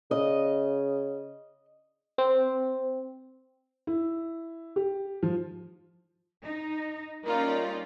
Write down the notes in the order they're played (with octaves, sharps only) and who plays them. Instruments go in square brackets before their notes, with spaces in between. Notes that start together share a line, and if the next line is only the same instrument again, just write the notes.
[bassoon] C#3 [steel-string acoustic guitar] D#5
[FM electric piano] C4
[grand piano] E4
G4
F3
[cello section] D#4
[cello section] G3 A#3 C#4 [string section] D#4 F4 D5 [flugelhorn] A#4